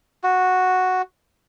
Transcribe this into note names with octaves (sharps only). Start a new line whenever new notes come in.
F#4